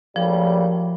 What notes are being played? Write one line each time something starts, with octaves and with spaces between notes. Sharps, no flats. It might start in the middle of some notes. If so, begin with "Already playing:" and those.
A#1 A2 F3 G3